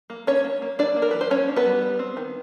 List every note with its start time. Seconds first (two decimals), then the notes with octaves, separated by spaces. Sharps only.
0.10 A#3
0.27 C#4 D4 C#5
0.44 A#3
0.62 A#3
0.79 A#3 D4 D5
0.96 A#3
1.02 A#4
1.11 E3 B4
1.21 C5
1.30 A#3 C#4 C#5
1.48 D4
1.56 B3 B4
1.64 G3
1.82 G3
1.99 C4
2.17 D#3